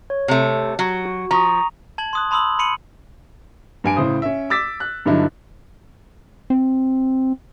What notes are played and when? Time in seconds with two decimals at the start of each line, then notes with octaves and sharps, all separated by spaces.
0.10 C#5
0.28 C3 A3
0.79 F#3
1.05 F#4
1.31 F3 A#5 C#6 D#6
1.98 A5 G#6 F#7
2.13 C6 D#6 F#6
2.31 A5 B5 C6 D#6 E6 F#7
2.59 B5 C6 C#7 D#7 F#7
3.84 G2 G#5 D7
3.96 A2 C#3 E4 C5 D#6
4.22 C#4 E5
4.50 D6 E6 A6 B6
4.80 F#6
5.06 G2 D3 F#3 D#4 E4
6.50 C4